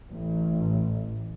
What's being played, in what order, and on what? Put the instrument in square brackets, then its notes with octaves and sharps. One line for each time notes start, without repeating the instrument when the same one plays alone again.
[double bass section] A1